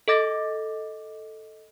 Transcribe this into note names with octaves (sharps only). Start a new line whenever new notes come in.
A4 D#5 D6 A6 A#6